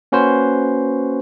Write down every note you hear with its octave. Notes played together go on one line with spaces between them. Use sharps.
A#3 C#4 F#4 B4 C5